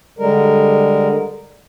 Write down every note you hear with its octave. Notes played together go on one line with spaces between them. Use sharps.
D3 G3 G#3 A#4